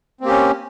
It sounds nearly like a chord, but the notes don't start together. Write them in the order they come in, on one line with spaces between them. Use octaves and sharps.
C4 A#3 G4 C#4